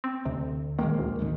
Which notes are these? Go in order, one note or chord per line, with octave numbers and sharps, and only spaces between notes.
C4
D2 C3
A#1 D#3 G#3 A#3
D2
G#1 D3 D#3